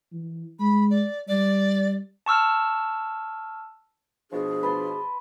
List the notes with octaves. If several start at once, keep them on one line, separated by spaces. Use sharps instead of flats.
E3
G#3 B5
D5
G3 D5
A5 C#6 E6 F6
B2 F3 D4 G#4
B4 A5 C6